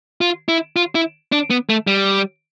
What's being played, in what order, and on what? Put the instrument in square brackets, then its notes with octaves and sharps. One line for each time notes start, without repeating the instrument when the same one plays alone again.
[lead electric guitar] F4
E4
F4
E4
D4
B3
A3
G3